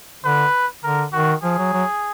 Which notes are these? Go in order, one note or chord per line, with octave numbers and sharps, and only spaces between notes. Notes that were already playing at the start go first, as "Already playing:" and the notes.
D3 B4
D3 A#4
D#3 F#4
F3 G#4
F#3
F#3